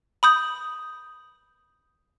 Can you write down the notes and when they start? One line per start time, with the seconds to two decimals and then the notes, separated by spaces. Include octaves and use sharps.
0.23 B5 D#6 G6